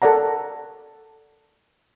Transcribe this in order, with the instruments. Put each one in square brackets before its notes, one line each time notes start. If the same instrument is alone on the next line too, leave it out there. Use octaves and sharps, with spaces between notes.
[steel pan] A4 A#4 D5 F#5 A#5